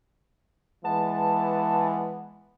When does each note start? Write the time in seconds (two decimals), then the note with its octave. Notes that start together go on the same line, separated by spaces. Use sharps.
0.85 E3 G#3 B3 A5